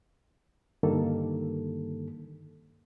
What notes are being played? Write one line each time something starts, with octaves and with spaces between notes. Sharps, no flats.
G2 D3 D#3 G3 A#3 A4